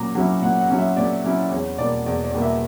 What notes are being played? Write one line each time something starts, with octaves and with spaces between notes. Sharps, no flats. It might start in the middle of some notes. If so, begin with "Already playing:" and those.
Already playing: A#2 F#3 C#4 A#5 D6
F#3 C#4 E4
A#2 F#5
F#5
F#3 C#4 E4
E5
A#2 D5
F#3 C#4 E4
E2 C#5
B2 G3 A#3 D5
E2 D5
D5
B2 G3 A#3
E5